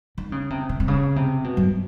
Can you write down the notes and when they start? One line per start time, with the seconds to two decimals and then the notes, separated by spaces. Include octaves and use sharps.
0.18 D#3
0.32 C#3
0.50 C3
0.69 C3
0.80 C3
0.88 C#3
1.16 C3
1.44 B2
1.57 F#2